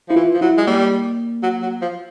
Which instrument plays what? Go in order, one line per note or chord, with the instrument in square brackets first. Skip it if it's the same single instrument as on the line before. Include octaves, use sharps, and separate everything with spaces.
[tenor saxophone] F3 [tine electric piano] E4
[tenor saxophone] E3 [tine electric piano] F4
[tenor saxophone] F3
[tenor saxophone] F#3 [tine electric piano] E4
[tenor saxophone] G#3
[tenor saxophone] G3 [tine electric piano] A#3
[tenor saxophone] F#3
F#3
F3